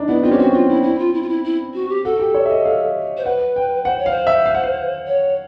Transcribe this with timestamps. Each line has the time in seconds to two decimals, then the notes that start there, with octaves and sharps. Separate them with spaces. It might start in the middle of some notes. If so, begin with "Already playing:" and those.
Already playing: D4 D#4
0.08 B3 E4
0.23 C4 F4
0.31 C#4 G4
0.38 C4 F#4
0.53 F4
0.69 E4
0.83 E4
0.99 F4
1.14 E4
1.22 F4
1.29 E4
1.44 E4
1.74 F#4
1.89 G4
2.04 F#4 A4
2.20 G4
2.34 C#5
2.46 E5
2.50 D#5
2.65 F5
3.17 C5
3.25 B4 F#5
3.56 G5
3.85 C5 F#5
3.98 C#5
4.06 F5
4.11 C5
4.27 E5
4.46 F5
4.55 F#5
4.64 F5
5.07 C#5